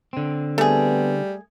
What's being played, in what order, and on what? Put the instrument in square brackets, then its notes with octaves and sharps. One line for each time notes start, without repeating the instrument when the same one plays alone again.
[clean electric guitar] D3 C4
[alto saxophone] G3 [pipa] A3 G#4 [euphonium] B3